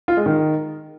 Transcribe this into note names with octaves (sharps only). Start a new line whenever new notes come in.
F4
G#3
D#3